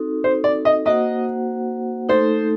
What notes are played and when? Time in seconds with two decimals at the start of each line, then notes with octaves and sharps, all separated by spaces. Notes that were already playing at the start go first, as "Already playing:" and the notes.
Already playing: C4 D#4 F#4 A4
0.24 C5
0.44 D5
0.65 D#5
0.86 A#3 F#4 C5 D#5 F#5
2.09 A3 D#4 A4 C5